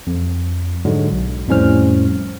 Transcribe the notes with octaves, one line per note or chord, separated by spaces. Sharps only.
F2
G#2 D3 F#3 G#3
B1
F2 A2 G3 C#4 C5 F6